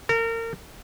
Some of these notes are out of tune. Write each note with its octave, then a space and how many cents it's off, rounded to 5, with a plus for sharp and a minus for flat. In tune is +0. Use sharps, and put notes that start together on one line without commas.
A#4 -30